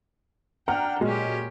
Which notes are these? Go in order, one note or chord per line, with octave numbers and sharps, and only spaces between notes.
D4 F#5 G5 A#5 F6
A#2 F#3 G#3 C#4 G4